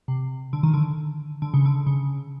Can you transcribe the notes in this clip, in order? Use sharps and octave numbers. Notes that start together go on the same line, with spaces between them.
C3
D3
D#3
D3
D3
C#3
D3
C#3